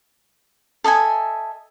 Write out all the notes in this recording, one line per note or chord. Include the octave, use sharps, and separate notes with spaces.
A4 D#5 E5 G#5